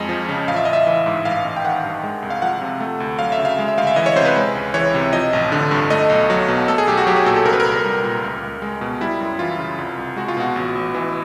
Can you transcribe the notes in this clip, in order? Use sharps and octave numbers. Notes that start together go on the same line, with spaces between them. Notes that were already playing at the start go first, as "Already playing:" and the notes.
Already playing: F2 G#3 D#5
F3
C#3
A1 F5
E5
A1 D#5
E5
E3
G#2
A1 F5
A1
G5
D#3 F#5
G2
G#3
C2
F5
F3 F#5
C3
A3
D2
F#3 F5
E5
C#3
F5
G#3
E5
D2 F5
E5
E3 D#5
C#5
C3 C5
B4
G#3
C#2
E3 C#5
C3
F3 D#5
A1
D3
G2
A3 D#5
B1
F#3
B2
A3 A4
G#4
B1 G4
F#4
F#3 G4
G#4
A#2 A4
A4
C2 A#4
B4
A#4
C2
G3
A#2
C#2
C#2
G#3
B2
G3 E4
F#2
E3 F4
C#3
C2
C2
G#3 F#4
F4
B2 F#4
A1
A1
E3